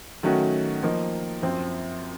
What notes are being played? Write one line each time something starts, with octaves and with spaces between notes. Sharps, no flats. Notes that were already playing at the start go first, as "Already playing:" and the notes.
D#3 F#3 A3 C#4 F#4
F3 A#3 D#4
F#2 F3 C4